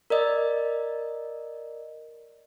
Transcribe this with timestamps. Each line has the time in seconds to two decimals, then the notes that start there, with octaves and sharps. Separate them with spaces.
0.10 A#4 D5 D#5